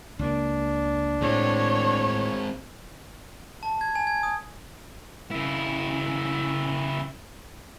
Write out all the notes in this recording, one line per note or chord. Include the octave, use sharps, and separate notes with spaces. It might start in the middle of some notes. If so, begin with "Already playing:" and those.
C#2 A#3 D4
A2 G#3 C4 C#5
A5
G#6
G#5
G#6
D#6
C#3 E4